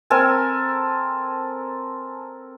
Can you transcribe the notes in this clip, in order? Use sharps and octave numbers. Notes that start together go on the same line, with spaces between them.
C4 A4 A#4 G#5